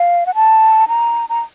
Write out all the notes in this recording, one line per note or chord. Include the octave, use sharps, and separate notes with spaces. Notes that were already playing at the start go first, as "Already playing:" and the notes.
Already playing: F5
F#5
A5
A#5
A#5